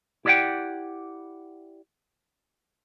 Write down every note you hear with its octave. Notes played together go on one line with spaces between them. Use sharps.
E4 G4 D5 D#5 F#5 G5